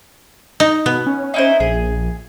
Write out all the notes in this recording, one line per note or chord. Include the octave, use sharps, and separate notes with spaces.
D#4
B2 B3
C#4
D#4 E4 C5
A#1 G#4